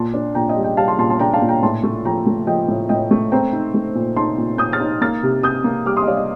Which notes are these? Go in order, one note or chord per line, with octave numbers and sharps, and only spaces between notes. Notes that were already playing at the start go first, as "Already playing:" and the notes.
Already playing: A#2 A5 C6
D4
A#2 G5 A#5
D#5 G5
G3
D#5 G5
G3 F5 A5
A5 C6
A#2 A5 C6
A5 C6
D4 G5 A#5
F5 A5
A#2
G5 A#5
A2 A5 C6
A3
F3 G5 A#5
A3
F3 D#5 G5
A2
A2 D#5 G5
A3
C4 G5 A#5
D#4
A3
A#2
D#4 A5 C6
A#2
A#2 D#6 G6
F6 A6
D#4
A#3 F6 A6
C3
C3 D#6 G6
A#3
G3 D6 F6
C6 D#6
D#5
G3 D5 F5
D#5